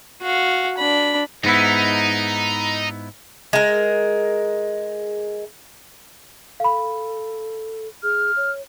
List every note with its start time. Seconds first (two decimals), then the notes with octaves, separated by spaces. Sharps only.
0.22 F#4 F5
0.78 D4 B5
1.44 G#2 B3 D#4 E4
3.53 G#3 A#4
6.60 A4 F5 B5
8.03 G#4 F6
8.36 C#5